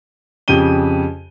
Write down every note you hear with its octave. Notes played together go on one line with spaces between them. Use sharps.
F2 C#3 G4 D#7 G7